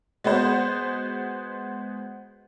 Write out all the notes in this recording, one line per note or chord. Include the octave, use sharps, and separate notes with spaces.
G#3 B3 F#4 C5